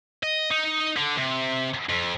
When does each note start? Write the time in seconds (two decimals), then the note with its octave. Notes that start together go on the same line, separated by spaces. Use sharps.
0.23 D#5
0.51 D#4
0.97 D3
1.18 C3
1.89 F2